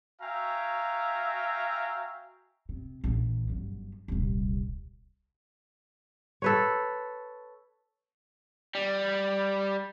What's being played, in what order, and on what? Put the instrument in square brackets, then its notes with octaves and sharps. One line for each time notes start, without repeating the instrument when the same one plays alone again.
[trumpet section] F#4 E5 F5 G5 G#5 A#5
[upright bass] C3
A#1 E3
G1 F#2
D#1 C2
[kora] A4 B4 C#5
[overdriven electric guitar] G3